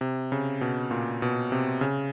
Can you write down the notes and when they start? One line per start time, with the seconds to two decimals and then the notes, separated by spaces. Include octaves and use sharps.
0.01 C3
0.32 C#3
0.61 B2
0.91 A#2
1.22 B2
1.52 C3
1.81 C#3